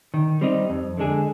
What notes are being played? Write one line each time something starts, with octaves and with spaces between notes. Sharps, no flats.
D#3
G3 C4 D#4
F2
D3 G#3 D4 G#4